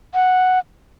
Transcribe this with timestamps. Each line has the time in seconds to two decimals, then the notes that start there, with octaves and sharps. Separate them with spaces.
0.15 F#5